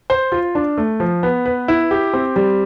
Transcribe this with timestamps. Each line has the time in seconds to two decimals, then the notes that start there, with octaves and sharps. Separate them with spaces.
0.10 C5
0.32 F4
0.55 D4
0.78 A3
1.00 F3
1.23 B3
1.46 B4
1.68 E4
1.91 G4
2.13 C4
2.36 G3